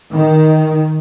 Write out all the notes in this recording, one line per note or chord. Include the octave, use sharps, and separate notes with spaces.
D#3